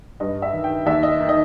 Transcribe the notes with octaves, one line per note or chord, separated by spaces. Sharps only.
G2 D#5
E5
D#3
G5
D#2 E5
D#5
D#3
D#5